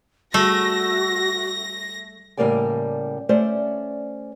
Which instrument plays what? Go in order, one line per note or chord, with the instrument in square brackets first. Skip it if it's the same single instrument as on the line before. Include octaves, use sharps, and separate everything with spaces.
[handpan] G3 G#4 [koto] A3 [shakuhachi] F#4 [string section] A#6
[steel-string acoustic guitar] A2 C#3 G3 A#3 D5 G#5
A3 C#4 C5 D5